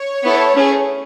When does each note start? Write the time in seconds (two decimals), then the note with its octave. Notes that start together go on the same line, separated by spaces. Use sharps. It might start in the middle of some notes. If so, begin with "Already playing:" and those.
Already playing: C#5
0.24 B3 E4 A4
0.54 A3 C#4 G#4